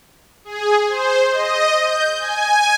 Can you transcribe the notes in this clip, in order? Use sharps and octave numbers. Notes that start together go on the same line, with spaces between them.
G#4
C5
D#5
G6
G#5